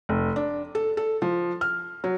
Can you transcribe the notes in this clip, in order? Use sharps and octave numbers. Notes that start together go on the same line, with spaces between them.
F1
D4
A4
A4
F3
F6
F#3